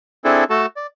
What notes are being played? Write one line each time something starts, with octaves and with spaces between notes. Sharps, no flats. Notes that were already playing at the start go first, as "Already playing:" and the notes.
C4 D4 E4 G#4 A4
A3 F#4 A4 A5
D5